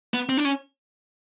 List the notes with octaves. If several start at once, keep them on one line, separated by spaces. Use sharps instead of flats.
B3
C4
D4
C#4